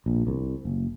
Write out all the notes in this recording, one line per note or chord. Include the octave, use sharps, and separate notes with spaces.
A#1
C2
F#1